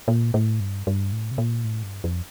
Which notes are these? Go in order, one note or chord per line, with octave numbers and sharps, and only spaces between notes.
A#2
A2
G2
G2
A2
C3
A#2
A2
G2
F2